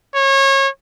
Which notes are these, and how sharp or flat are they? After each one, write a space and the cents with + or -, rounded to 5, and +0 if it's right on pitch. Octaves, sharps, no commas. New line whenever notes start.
C#5 -30